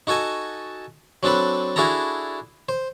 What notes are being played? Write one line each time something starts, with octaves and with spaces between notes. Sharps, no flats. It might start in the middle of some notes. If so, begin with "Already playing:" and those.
D#4 F#4 A4 G#5 A5
F#3 C4 D4 A4 B4
D4 E4 F#4 G#4 A4 A#5
C5